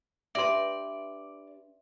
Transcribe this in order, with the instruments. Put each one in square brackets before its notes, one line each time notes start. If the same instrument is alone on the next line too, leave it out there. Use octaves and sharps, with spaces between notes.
[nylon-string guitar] D4 G4 B4 [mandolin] D5 [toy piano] E5 C6